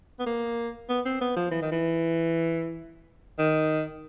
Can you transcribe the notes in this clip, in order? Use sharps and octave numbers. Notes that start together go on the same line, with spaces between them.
B3
A#3
B3
C4
B3
F3
E3
D#3
E3
D#3